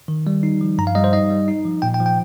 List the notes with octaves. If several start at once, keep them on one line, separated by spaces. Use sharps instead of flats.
D#3
G3
D#4
F3
G2 A#5
F5
G3 D#5
C5
D#4 D#5
G3
D#4
F3
A#2 G5
G5
F3
G5